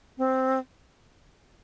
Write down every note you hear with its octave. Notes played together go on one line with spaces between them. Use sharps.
C4